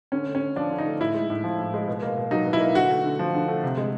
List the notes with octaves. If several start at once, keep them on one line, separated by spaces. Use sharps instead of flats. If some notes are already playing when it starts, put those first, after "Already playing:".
D3 C#4
A3
C#4
D3
F3 D4
D3
D#4
A3
A2 E4
G#3
A2
F3
A2
G#3
B2
A#3
B2
F#3 D#4
B2
E4
A#3
D3 F#4
A3
D3
F3
D3
A3
C3
G#3